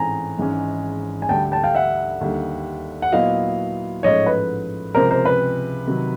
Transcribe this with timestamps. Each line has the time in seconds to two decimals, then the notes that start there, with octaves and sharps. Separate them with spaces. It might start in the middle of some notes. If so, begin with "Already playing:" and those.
Already playing: A1 G#2 E3 A3 C4 G#5 A#5
0.39 G#1 G#2 E3 G#3 C#4
1.22 G#5
1.29 D2 D3 G3 G5 A5
1.52 G5 A5
1.64 F5 G5
1.75 E5 F#5
2.21 D#2 D3 G3
3.02 F#5
3.12 A#2 F#3 B3 E4 D#5 F5
4.03 A1 G#2 F3 A3 C#5 D#5
4.26 B4
4.95 C#2 C3 F3 G#3 A#4 C5
5.11 A#4 C5
5.25 B4
5.87 C3 D#3 F#3